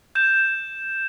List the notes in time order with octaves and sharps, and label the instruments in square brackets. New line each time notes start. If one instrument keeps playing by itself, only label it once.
[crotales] G6 E7